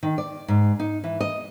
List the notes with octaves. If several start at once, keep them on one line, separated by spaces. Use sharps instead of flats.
D#3
D5
G#2
D#4
E3
D#5